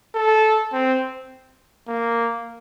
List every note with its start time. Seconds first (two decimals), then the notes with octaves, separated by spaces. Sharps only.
0.15 A4
0.73 C4
1.88 A#3